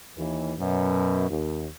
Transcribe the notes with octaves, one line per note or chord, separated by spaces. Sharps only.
D#2 E3
F#2 B2
D#2